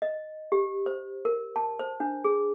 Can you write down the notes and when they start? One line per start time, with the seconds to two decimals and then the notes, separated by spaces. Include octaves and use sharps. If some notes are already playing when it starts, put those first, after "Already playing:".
0.02 D#5
0.52 G4
0.86 C5
1.25 A#4
1.56 A5
1.79 C5
2.00 D4
2.24 G#4